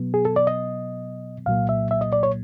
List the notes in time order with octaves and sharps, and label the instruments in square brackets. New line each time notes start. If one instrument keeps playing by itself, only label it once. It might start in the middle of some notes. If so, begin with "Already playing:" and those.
Already playing: [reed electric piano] B2 F#3 B3
G#4
A4
D5
D#5
C2 A#2 F#3 A#3 F5
E5
E5
D#5
D5
C#5